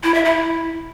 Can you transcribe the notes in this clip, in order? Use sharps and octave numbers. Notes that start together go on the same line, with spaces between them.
E4
E5
E4